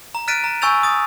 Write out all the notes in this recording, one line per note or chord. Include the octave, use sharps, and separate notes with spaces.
A#5
F6 F#6 A6 B6 D7 D#7
A#5
G#5 C#6 E6 G6 A6 F7
D#6 A6